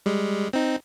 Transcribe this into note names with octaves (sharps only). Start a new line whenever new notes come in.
G3 G#3
C4 D#4